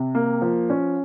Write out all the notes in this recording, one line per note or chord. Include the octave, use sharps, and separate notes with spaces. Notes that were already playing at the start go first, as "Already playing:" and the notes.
Already playing: C3
A#3
F3
C#4